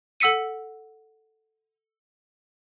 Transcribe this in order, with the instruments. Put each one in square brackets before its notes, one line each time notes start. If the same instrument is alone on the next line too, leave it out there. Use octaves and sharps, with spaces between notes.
[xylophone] A4 F#5 E6 B6 C#7 D#7